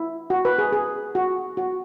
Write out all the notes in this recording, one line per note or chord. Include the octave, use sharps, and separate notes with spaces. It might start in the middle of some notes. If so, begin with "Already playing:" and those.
Already playing: E4
F#4
B4
G#4
G#4
F#4
F#4